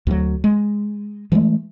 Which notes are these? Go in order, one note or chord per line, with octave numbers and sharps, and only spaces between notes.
D2 F#3
G#3
E3 F3 G#3 A3